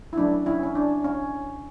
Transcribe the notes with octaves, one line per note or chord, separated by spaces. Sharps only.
E4
F#3 A3 C#4 D4
C#4 E4
C#4
D4
C#4